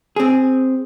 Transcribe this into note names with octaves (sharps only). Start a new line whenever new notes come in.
C4 G#4